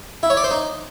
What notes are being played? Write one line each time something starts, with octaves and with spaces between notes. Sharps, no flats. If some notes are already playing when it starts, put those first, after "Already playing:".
E4
C#5
D5
C5
D#4